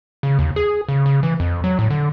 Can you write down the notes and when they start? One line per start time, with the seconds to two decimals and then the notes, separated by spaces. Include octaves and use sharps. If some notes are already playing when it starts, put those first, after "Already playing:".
0.23 C#3
0.39 D#2
0.56 G#4
0.88 C#3
1.06 C#3
1.23 E3
1.40 F2
1.64 F#3
1.79 A2
1.90 D3